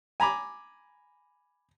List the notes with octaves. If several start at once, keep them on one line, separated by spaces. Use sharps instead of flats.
G#5 A#5 B5 D6